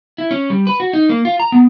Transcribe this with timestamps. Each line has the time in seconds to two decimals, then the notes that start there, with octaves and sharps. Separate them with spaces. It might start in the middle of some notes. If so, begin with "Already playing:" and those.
0.18 E4
0.31 C#4
0.50 G3
0.67 B4
0.80 F#4
0.93 D#4
1.09 A#3
1.25 F4
1.40 A#5
1.52 B3